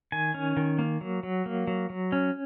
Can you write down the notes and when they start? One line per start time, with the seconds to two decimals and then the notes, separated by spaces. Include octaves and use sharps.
0.12 D#3 G#5
0.34 C#4
0.57 D#3
0.79 A#3
1.01 F#3
1.23 F#3
1.46 A#3
1.67 F#3
1.90 F#3
2.12 C#4